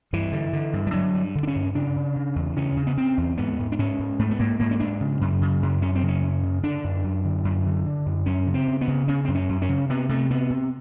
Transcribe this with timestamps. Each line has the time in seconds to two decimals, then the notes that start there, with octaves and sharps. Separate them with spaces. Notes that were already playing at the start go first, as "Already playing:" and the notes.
0.13 G2 E3
0.32 D3
0.53 D3
0.73 G2
0.87 G3
0.93 D3 F#3
1.14 G2
1.35 D3
1.43 D4
1.48 C#4
1.55 G2
1.75 C#3 D4
1.96 C#3
2.16 C#3
2.36 E2
2.56 C#3 C#4
2.77 C#3
2.87 B3
2.97 C#3 C4
3.17 E2
3.38 G#2 B3
3.59 G#2
3.72 D4
3.79 G#2 C#4
3.99 G#2
4.19 G#2 A3
4.31 B3
4.39 G#2 A#3
4.60 G#2 A#3
4.71 C#4
4.80 G#2 D4
5.01 C#3
5.21 F#2
5.42 C#3
5.62 F#2
5.82 F#2 C#4
5.95 C4
6.03 C#3
6.08 C#4
6.23 F#2
6.43 C#3
6.63 D3 D4
6.84 F#2
7.04 F#2
7.25 D3
7.44 F#2
7.66 D3
7.85 D3
8.06 F#2
8.26 F#2 C#4
8.47 C#3
8.54 C4
8.68 C#3
8.81 B3
8.88 C#3
9.08 C#3 C#4
9.25 F#2 C4
9.35 C#4
9.49 F#2
9.62 C#4
9.69 C#3
9.89 C3 B3
10.09 C3 A3
10.30 C3 B3
10.50 C3